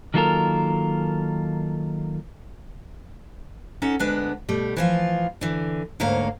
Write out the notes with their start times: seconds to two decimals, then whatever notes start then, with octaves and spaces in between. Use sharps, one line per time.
0.14 D#3 F#3 A#3 F4 A4 A#4
3.82 C#4 D#4 A4 F#5
3.99 D2 G#3 B3 D4 B4
4.49 B2 G3 A3
4.77 E3 F3 F4
5.41 D3 E3
6.00 D2 G#2 A#3 C#5 F5